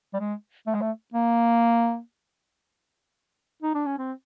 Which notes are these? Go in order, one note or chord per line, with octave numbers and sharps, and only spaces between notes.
G3
G#3
A3
G#3
A3
A#3
D#4
D4
C#4
C4